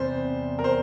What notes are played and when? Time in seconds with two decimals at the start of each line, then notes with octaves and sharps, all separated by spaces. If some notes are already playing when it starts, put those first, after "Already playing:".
Already playing: E2 C3 G3 C5
0.59 A#4
0.64 C5